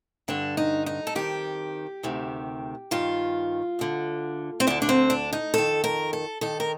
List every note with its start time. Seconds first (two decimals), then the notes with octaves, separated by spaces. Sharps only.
0.28 G2 D3 D4
0.57 D#4
0.86 D#4
1.07 A4
1.15 F2 D#3 G4
2.03 D2 C3 D#3
2.91 G2 D#3 F4
3.79 D2 D3
4.60 C4
4.67 D2 D3 D4
4.82 D4
4.89 C4
5.10 D4
5.33 D#4
5.54 F2 D#3 A4
5.84 A#4
6.13 A4
6.41 G2 D#3 A4
6.60 A#4